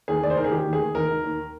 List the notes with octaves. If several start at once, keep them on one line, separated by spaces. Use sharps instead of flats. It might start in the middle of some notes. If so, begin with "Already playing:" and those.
D#2 G#4
D#2 D5
C5
D#3 A#4
G#4
D#3 G4
D#2
G#4
D#2
D#3 A#4
D#3
D#2